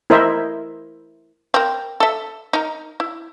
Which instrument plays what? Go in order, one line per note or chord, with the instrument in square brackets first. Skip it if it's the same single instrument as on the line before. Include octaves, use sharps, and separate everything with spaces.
[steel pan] E4 A#4 C5 D#5 E5
[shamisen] C4 A#4
A4 E5
D#4 A#4
E4